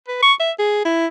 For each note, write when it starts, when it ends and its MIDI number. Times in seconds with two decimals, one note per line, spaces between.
0.08 0.20 71
0.23 0.33 85
0.40 0.52 76
0.59 0.84 68
0.85 1.06 64